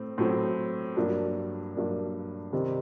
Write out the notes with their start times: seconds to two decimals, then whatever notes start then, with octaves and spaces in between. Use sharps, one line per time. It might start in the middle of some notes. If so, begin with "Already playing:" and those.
Already playing: A2 C4
0.18 A2 F#3 C4
0.96 G2 F#3 A#3 D4
1.74 G2 F#3 A#3 D4
2.53 C3 D#3 G3 C4